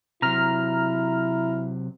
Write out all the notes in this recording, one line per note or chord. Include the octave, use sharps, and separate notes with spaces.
C3 F#3 E4 A#5 F6